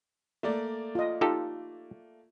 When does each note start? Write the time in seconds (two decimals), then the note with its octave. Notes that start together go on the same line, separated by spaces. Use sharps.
0.43 A3 A#3 D5
0.95 F4 D#5
1.21 D#4 F4 G4 A4